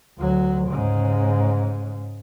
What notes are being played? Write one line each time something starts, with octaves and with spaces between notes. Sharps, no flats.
D2 F#3
G#2 C#3